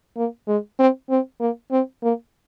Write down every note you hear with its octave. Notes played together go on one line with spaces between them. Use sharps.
A#3
G#3
C4
C4
A#3
C4
A#3